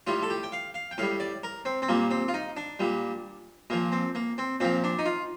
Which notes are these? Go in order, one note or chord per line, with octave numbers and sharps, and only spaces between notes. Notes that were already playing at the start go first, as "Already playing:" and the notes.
A2 G3 F4
A4
G4
G5
F5
F5
G5
A2 G3 F5
D5
A#4
C4
C4
A#2 G3 A#3
C4
F4
D#4
D4
A#2 G3
A#2 F3 A#3
C4
A#3
C4
A#2 F3 C4
D4
D#4
F4